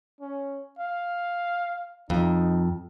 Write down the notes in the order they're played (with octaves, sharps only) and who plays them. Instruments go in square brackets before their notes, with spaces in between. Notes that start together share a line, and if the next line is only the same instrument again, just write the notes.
[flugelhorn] C#4
F5
[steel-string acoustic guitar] F2 [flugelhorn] D#4